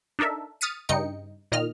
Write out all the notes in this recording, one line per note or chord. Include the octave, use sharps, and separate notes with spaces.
D4 D#4 A4 A#4 E5
D#6 F6 A6 B6 C#7 D#7
G2 C#3 D#4 D#5 G5 C#7
A#2 D#3 D#5 F6